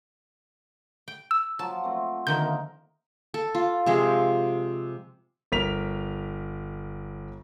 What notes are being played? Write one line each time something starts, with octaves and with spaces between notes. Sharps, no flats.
G5
E6
F3 F#3 A5
A3 C4
D3 D#3 F3 A#4 D#5 E5 G6
A#3
A4
F4
C3 F3 G#3 G#4
G1 A#4 B6 F7